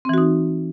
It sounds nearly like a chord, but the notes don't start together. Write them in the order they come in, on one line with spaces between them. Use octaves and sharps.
C4 E3 F#4 D#4